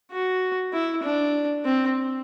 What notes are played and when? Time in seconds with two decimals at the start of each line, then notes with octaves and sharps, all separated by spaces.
0.12 F#4
0.73 E4
1.03 D4
1.65 C4